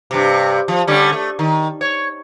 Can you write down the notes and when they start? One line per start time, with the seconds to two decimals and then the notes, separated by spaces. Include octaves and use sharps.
0.11 G2 C3
0.68 F3
0.87 D3 G3 C#4
1.12 A3
1.39 D#3
1.81 C#5